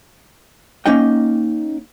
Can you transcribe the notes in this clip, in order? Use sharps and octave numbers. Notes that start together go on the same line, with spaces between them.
A#3 C#4 D#4 D#5 G5